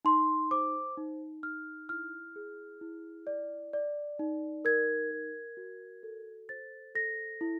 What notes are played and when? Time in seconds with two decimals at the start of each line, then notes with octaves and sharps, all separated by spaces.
0.05 D#4 C6
0.51 C5 D6
0.97 D#4
1.43 D#4 F6
1.89 E4 F6
2.36 G#4
2.81 E4
3.27 D5
3.73 D5
4.19 D#4
4.65 A#4 G#6
5.11 A#4
5.57 F#4
6.03 A4
6.49 C5 A6
6.95 A4 A#6
7.41 E4